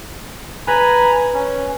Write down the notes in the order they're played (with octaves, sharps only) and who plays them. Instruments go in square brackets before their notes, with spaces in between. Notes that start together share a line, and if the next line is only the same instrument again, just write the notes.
[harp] B4 [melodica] G#5 A#5 B5
[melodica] C#4